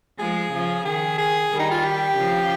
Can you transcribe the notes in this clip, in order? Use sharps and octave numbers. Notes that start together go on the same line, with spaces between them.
F3 G#3 G#4
C#3 F3
D#3 G#4
G#4
D#3 G3
D#4
F4
G4
C#3 F3